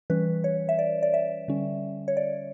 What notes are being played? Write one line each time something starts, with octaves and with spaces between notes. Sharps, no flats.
E3 G3 C#4 B4
C#5
E5
D5
D5
E5
D3 G3 C#4
C#5
D5